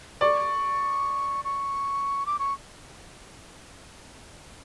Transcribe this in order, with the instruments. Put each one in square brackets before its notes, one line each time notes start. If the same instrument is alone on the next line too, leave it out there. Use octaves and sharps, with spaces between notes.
[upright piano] D5 [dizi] C#6
[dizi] C#6
D6
C#6